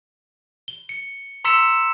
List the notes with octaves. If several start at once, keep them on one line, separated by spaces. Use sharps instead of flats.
G7
C#7
A#5 C6 E6 B6 C#7 E7